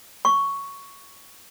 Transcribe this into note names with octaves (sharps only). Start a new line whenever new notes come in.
C#6